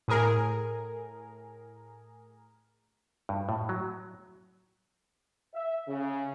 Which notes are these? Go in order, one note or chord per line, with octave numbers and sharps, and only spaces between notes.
A2 G#4 A#4
G2
A2
F#3
E5
C#3